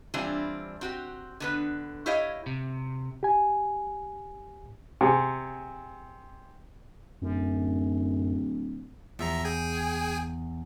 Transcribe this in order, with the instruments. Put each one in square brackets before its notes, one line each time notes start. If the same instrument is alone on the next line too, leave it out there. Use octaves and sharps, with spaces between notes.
[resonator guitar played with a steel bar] E3 G3 C4 D4 E4 F4
C4 F#4 G4
D3 B3 B4
E4 G4 C#5 D#5 F5
[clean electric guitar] C3
[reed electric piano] G4 G#5
[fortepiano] C3 G#4
[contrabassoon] D1 [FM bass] F#2
[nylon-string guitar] E2 [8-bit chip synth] F3 E5 A#5
[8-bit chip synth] G#4 G5 G#5